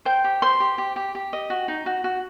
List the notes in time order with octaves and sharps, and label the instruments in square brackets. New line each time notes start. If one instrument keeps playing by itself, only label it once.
[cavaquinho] C5 G5
G4
C5 C6
G4
G4
G4
G4
D#5
F#4
D#4
F#4
F#4